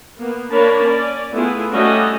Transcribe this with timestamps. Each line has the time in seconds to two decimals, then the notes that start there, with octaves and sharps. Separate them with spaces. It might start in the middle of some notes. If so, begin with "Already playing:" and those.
0.18 A#3 B3
0.51 A#3 D4 A#4 C#5 A5 B5
0.85 C#4 D5
1.34 A3 B3 E4 F4 G#4
1.73 G3 A3 C#4 F#4 D#5 E5